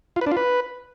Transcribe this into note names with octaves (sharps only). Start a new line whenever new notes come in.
F4
B4
D4
F4
B4